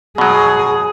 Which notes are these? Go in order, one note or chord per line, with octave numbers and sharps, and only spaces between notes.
B2 F#3 G#4